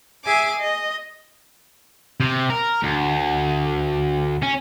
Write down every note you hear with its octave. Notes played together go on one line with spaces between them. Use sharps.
G#4 E5 G#5 D6
D#5
C3
A#4
D2
C#4